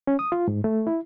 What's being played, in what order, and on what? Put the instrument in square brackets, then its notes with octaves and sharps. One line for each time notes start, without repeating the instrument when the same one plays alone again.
[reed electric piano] C#4
D#6
F4
G#2
A3
E4